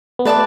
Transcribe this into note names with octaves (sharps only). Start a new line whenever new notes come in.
B3
A3 B4 D5 A5 D6